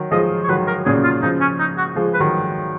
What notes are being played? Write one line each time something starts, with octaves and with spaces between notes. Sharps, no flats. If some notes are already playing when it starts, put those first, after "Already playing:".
Already playing: D#3 F#3
F3 G#3 D#5
C#5
D#3 F#3 B4
A#4
A#2 C#3 G#4
F4
C#3 F3 D#4
C#4
D#4
F#4
F3 G#3
B4
D#3 F#3